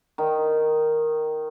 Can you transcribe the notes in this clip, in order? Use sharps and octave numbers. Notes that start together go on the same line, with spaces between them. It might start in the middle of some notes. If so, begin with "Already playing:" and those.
D#3